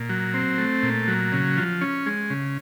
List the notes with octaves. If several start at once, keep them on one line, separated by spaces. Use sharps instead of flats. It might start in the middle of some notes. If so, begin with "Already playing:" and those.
Already playing: A#2
F#3
C4
A3
A#2
F#3
C#3
F3
C#4
G#3
C#3